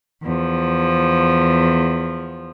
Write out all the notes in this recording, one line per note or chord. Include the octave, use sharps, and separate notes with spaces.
E2 F3